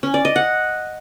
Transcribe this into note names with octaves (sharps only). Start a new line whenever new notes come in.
C#4
D5
D#5
F#5